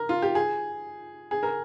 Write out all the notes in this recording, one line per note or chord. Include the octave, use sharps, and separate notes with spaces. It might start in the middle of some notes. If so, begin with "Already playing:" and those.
Already playing: A#4
F4
G4
G#4
G#4
A#4